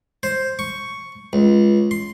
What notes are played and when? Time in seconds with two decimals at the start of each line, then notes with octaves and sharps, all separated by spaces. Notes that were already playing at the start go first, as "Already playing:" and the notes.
0.23 C5
0.59 C#6
1.33 C#2
1.91 C6